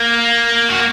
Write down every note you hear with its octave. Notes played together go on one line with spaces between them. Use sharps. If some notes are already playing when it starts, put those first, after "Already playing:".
Already playing: A#3
F#4